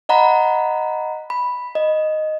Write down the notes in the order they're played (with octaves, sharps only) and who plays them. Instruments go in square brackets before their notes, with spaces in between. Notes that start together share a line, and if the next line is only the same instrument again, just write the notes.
[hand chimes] D#5 F#5 A#5 B5
B5
D#5